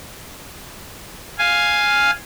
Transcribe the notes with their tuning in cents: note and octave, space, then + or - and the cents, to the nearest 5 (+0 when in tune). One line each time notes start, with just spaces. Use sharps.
F5 +0 G#5 +0